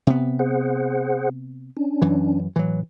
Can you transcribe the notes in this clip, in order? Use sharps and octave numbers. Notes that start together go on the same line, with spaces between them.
C3 B3
G#4 C5 F#5
C#4 D4
F#2 E3
A2 E3 F#3